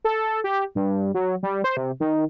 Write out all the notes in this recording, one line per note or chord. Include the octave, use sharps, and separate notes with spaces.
A4
G4
G2
F#3
G3
C5
C3
D#3